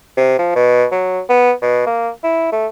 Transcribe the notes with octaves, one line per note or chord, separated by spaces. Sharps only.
C3
F3
B2
F#3
B3
B2
A#3
E4
A3